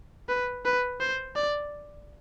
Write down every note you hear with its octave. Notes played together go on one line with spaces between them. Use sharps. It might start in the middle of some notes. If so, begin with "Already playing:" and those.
B4
B4
C5
D5